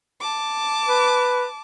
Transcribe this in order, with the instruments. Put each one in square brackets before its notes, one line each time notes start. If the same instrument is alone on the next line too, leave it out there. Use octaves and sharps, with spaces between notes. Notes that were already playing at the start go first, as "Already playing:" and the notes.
[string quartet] A5 D6
[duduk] B4